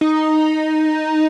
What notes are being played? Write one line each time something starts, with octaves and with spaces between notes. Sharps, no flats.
D#4